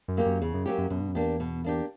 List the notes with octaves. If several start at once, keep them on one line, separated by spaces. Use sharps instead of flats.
F#2
F#3 A#3 C#4 G4
F#2
E2 C#3
F#2
F#3 A#3 C#4 G4
F#2
F#2 B2
G2
F#2
E2 A#3 D4 G4
B2
A#3 D4 G4